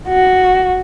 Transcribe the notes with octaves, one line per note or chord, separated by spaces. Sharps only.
F#4